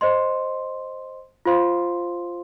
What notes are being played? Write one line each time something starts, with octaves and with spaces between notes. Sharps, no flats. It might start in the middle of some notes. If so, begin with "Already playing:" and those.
C5 D#5 C6
F4 C5 F5 C6